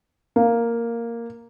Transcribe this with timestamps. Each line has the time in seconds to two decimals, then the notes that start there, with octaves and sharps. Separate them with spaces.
0.36 A#3